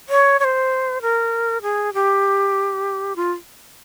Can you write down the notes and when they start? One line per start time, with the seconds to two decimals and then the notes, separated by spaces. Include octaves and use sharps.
0.09 C#5
0.39 C#5
0.44 C5
1.02 A#4
1.62 G#4
1.94 G4
3.16 F4